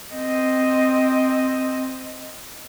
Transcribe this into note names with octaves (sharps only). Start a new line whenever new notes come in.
C4 D#5